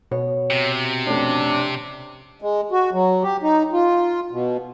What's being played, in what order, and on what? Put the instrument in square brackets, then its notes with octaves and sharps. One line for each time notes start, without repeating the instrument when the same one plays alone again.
[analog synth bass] B2 [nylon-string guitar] C#5
[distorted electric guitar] C3
[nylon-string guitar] F2 A3 C#4 [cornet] D4
[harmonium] G#3
F#4
F#3
G4
D#4
F4
B2